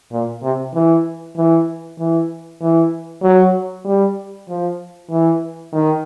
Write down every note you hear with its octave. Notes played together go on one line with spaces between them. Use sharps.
A#2
C3
E3
E3
E3
E3
F#3
G3
F3
E3
D#3